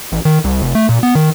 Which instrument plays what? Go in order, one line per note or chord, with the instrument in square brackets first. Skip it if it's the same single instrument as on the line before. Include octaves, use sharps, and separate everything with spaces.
[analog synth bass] A1
D#3
C2
F1
A3
A#2
B3
D#3